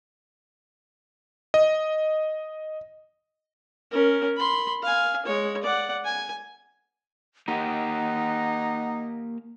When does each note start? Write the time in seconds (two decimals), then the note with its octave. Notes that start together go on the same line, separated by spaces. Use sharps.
1.54 D#5
3.91 C#4 A#4
4.37 B5 C6
4.83 F5 G#5
5.26 G#3 C#5
5.63 D5 F#5
6.05 G#5
7.48 A#3 D#4 G4 F#5